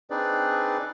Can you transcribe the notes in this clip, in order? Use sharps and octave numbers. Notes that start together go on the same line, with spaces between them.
C4 D4 D#4 G#4 B4 D5